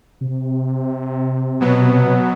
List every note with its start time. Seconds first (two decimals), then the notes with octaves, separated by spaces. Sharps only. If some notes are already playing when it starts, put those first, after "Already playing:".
0.21 C3
1.60 B2 F#3 B3